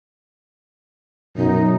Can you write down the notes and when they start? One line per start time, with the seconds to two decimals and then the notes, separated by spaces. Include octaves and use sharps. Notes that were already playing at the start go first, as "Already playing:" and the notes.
1.37 F#2 B2 D#4